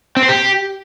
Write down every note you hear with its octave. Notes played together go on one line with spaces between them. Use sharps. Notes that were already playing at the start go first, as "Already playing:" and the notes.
C4
C5
G4